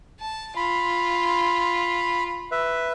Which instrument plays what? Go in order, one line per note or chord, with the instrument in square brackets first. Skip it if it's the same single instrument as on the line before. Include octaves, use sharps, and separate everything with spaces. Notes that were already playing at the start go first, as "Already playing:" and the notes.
[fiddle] A5
[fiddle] F4 [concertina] B5
[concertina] B4 E5